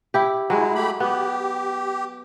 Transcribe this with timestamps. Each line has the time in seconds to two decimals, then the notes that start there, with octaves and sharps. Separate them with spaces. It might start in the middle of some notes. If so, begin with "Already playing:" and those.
0.14 E4 G4
0.50 F#3 G#3 E4
0.75 A3 G4 B5
1.00 B3 G4